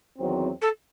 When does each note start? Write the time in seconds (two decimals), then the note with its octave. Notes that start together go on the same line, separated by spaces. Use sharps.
0.17 E2 D#3 F#3 C4
0.61 A4